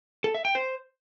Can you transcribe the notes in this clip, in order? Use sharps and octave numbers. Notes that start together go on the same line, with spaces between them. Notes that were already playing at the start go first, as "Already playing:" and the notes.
A4
E5
G5
C5